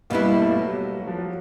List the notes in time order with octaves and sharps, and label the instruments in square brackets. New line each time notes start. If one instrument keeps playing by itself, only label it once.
[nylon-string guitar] B2 G3 B3 E4 [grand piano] A#3
[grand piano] A#3
A3
F#3
G3
F#3
F3
F#3